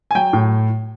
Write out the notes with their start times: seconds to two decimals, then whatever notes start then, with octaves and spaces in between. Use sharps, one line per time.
0.11 G#5
0.15 F#3 G5
0.33 A2